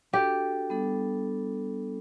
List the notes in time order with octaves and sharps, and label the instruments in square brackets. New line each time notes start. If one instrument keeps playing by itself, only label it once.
[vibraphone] D4 F#4 A4 [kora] G4
[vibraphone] G3 B3 D4 A4